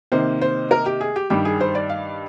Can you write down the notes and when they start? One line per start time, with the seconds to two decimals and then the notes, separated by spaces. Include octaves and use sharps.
0.12 C3 D#3 A#3 C5
0.41 C5
0.71 A#4
0.86 G4
1.01 G#4
1.16 G4
1.30 G2 D#3 G3 G4
1.45 G#4
1.60 C5
1.75 D5
1.89 F5